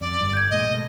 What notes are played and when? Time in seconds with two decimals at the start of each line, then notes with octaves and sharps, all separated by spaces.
0.01 F2 D5
0.21 G1 G2
0.33 G6 G#6
0.50 A1 A#2 G#3 D#5
0.71 B2 A3